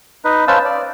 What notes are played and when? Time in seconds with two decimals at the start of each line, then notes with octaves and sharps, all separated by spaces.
0.24 D#4 B4
0.48 C#4 B4 C5 F5 A5 E6
0.65 D5